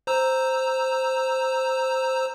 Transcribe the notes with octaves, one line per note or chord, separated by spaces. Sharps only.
C5 A#5 E6